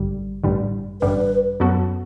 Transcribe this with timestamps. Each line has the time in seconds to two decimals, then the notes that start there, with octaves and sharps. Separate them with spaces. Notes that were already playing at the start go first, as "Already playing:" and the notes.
Already playing: A1 G2 D3 G3
0.44 A1 G2 D3 G3
1.01 A1 G2 D3 G3 B4
1.60 F#2 F#3 B3 F#4 A4